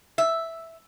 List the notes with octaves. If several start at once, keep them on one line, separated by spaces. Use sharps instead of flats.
E5